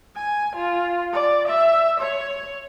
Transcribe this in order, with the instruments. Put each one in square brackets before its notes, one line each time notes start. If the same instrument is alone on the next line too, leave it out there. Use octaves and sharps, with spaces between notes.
[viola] G#5
F4
D5
E5
C#5